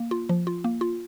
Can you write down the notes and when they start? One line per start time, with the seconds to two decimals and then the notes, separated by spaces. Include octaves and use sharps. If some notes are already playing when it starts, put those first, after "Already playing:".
Already playing: A#3
0.11 F4
0.29 F3
0.47 F4
0.64 A#3
0.81 F4